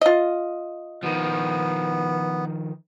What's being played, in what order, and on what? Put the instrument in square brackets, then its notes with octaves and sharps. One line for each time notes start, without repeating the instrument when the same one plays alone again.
[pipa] F4 D#5
[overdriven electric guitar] D#3 F3 [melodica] B3